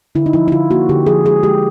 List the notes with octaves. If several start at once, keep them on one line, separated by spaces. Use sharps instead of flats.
D3 E4
D#4
F3 E4
E4
D3 F4
A#3 F#4
D3 G4
F3 G#4
G#3 G#4
G#3 G4